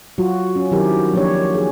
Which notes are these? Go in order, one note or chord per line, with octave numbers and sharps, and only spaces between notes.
F#3 F4 F#4
C#4
D#3 F#3 C4 E4 G4 A#4
F3 F#3 A#3 D4 G4 C#5
G#4